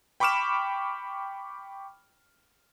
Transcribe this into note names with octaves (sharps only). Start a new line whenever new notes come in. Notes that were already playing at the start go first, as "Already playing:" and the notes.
G5 B5 C#6 D6 F6 E7